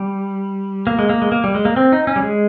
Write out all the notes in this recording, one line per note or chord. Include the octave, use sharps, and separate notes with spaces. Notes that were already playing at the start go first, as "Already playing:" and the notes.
Already playing: G3
A#3
G#3
A#3
G#3
A#3
G3
G#3
A#3
C4
D#4
C#4
G3
G#3